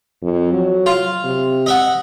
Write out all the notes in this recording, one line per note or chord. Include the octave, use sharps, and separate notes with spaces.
F2
F#3
F4
C3
D#5 E5 F#5